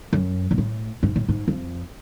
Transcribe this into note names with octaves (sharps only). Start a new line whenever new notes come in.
F#2
B2
A2
G#2
A2
G#2
F2